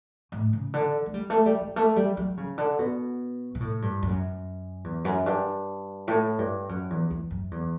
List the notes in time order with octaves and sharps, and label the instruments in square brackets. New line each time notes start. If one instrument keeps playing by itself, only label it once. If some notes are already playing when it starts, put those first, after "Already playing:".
[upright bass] A2
C#3
D3
A3
G3
A3
G3
G3
A3
G3
F#3
C#3
D3
B2
B2
A2
G2
F#2
E2
F#2
G2
A2
G2
F#2
E2
E2
F#2
E2